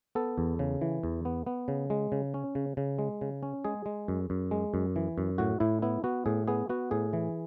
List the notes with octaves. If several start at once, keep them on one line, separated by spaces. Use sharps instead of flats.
B3 A4
E2
C#3
E3
E2
B3
B3
C#3
G#3
C#3
C#4
C#3
C#3
G#3
C#3
C#4
G#3 G#4
G#3
F#2
F#2
G#3
F#2
E3
F#2
A2 F#4
A2 E4
B3 E4
B3 F#4
A2 G#4
B3 G#4
B3 F#4
A2 G#4
E3